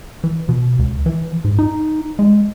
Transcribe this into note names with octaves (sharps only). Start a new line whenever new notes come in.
E3
B2
C#2
E3
G#2
D#4
G#3